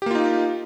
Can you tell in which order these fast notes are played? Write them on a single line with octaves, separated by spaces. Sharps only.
G4 A#3 F4 D#4